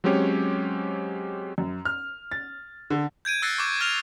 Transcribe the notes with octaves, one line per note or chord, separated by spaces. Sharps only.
F#3 G#3 C4 C#4 G4 C#5
F#2
F6
A6
D3
G6 G#6 D7 D#7
E6 F#6 A6 A#6 C7 C#7
C#6 D6 E6
F6 G#6 A#6 F7